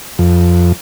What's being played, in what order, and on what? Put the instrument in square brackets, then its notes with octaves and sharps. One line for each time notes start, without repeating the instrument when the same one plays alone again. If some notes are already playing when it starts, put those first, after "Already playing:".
[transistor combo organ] F2